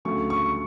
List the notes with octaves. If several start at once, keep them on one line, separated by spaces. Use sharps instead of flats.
D2 C#3 F#3 A3 C#6
C#6
C#6